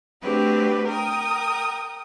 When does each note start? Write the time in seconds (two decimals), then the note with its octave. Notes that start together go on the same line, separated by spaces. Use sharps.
0.22 A3 C4 D4 F#4 G4 B4
0.87 A#4 G5 D#6